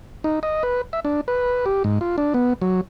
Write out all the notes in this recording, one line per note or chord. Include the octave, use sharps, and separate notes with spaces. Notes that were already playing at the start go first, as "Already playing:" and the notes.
D#4
D#5
B4
E5
D4
B4
G4
G#2
F4
D4
B3
F#3